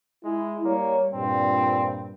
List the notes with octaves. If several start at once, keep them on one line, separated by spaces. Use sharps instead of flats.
G#3 E4
G3 A#3 C#5
G2 A#2 C4